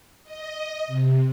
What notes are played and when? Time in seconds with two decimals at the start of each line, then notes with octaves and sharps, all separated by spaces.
0.23 D#5
0.87 C3